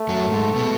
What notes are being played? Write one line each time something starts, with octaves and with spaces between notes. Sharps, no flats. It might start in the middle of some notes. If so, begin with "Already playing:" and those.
Already playing: A3
F#2 F#3
G#2 G#3
B2 B3